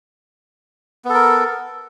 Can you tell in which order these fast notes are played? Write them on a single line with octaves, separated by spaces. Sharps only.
B3 A4 A#4